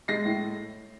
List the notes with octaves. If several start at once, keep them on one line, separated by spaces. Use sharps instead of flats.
G#3 A#6 C7
A2